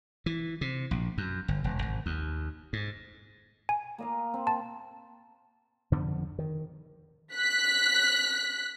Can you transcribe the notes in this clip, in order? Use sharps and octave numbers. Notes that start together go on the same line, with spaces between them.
E3
C3
A#1
F#2
G1
E1
G#1
D#2
G#2
G#5
A#3 D#5 F5
C4
A5
F2 D3 F3 B3
D#3
F#6 B6